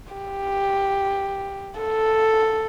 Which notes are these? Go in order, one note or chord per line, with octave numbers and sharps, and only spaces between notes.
G4
A4